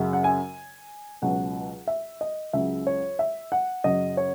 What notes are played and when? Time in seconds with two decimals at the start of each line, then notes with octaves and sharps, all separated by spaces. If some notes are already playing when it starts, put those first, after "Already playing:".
Already playing: F#2 C#3 F#3
0.13 F#5
0.24 G#5
1.22 C#2 B2 F#3 F#5
1.88 E5
2.21 D#5
2.53 C#2 C#3 F#3 E5
2.87 C#5
3.19 E5
3.52 F#5
3.84 F#2 C#3 F#3 D#5
4.17 C#5